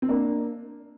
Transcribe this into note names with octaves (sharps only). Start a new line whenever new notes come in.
C4
A#3 D4